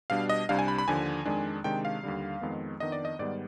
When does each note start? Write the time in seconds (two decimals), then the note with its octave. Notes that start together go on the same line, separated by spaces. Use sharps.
0.10 B2 G3 D4 F5
0.29 D#5
0.49 C2 C3 G3 D4 F5
0.59 G#5
0.68 B5
0.78 B5
0.88 D#2 D3 F3 G#5
1.26 F2 D#3 G#3 D4
1.64 C3 D#3 G#3 D4 G5
1.85 F5
2.03 D#2 D3 G3
2.41 F2 D#3 G#3 B3
2.80 F2 D#3 B3 D4 D#5
2.92 D5
3.05 D#5
3.19 G#2 D#3 G3 B3 D5